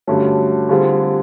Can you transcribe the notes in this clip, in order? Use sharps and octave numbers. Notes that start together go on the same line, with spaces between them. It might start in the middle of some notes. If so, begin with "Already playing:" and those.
G2 D3 F#3 A3 C#4
D3 G3 C4 F4 G#4